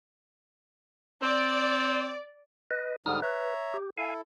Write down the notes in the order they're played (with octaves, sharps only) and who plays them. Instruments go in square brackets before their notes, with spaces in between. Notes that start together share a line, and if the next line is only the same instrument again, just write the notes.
[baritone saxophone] C4 [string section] D5
[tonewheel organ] B4 D#5
[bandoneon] G#2 D3 G3 [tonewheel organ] D#4 D#6 F6
[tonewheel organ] B4 [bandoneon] C#5 E5 A#5
[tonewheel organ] G4
[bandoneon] E4 A4 [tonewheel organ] F5 G#5